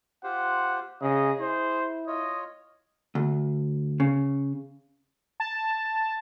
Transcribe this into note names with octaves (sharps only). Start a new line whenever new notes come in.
F4 G4 C5 F#5
C#3 G#4 D#5
E4 C5
F4 C#5 D#5
D2
C#3
A5